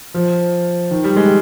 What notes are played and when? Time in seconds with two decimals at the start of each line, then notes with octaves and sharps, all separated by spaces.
0.14 F3
0.91 D#3
1.04 G3
1.17 G#3